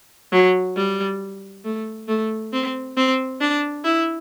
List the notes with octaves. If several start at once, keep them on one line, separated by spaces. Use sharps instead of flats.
F#3
G3
A3
A3
C4
C4
D4
E4